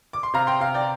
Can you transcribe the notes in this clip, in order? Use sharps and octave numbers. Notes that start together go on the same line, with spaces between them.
D6
C6
C3 F5 A#5
G5 C6
C3 F5
D5 G5